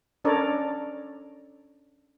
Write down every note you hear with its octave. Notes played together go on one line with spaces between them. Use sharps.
C#4 D4 A4 A#4 C#5 D5